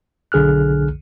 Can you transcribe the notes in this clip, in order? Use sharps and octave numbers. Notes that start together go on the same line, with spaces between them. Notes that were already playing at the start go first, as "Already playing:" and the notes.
B1 D3 G#4 F6 F#6